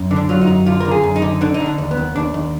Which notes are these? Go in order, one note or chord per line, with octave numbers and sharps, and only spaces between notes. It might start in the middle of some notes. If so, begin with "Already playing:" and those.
Already playing: F#2
D3
D4
F#3 F4
D#4
F#2
D3 F4
D3 A#4
G#4
F#2
D#4
D3
D3 D4
D#4
D3
D4
D#2
B3
D#2
D#2 D4
D#2